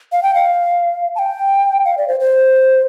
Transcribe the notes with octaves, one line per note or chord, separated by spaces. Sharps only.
F5
G5
F5
A5
G5
F5
D5
C5
C5